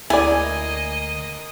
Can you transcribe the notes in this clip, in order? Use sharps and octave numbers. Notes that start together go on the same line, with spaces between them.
D2 A#3 E4 D5 D#5 G#5